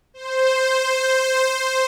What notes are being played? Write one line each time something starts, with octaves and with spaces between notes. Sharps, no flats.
C5